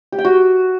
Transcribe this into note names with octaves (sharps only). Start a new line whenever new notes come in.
G4
G5
F#4